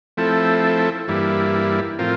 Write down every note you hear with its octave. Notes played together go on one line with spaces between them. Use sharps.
F3 A3 C4 E4 A4
G2 E3 G3 A#3 E4
A2 F3 C4 F4 A#4